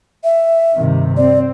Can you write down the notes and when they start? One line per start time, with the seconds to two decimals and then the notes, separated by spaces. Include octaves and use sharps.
0.24 E5
0.75 G2 C3 D#3
1.17 C4 D5